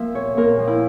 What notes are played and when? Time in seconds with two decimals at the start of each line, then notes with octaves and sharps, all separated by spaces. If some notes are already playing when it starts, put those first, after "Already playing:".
Already playing: F3 A#3 A#4 E5
0.14 A#2 C#5
0.37 A#2 A#4
0.59 F3
0.67 E4